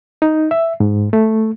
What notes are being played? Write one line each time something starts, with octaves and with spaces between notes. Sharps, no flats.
D#4
E5
G#2
A3